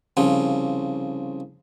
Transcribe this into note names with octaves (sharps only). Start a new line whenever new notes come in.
C2 C#3 F3